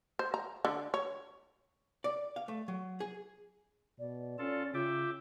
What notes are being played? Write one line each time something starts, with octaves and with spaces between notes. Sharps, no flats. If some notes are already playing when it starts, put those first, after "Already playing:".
C5
A#5
D3
C#5
D5
F5
A3
F#3
G#4
B2 D5
C#4 F4 A4 A5
C#3 F4 E5 G5 D6